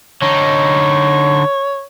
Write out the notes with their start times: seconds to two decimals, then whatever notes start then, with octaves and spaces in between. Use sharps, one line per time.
0.22 D3 D#4 C#5